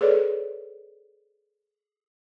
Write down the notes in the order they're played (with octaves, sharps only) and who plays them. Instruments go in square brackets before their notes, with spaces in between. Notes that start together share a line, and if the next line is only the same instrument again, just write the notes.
[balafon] G#4 A4 B4 C#5 D5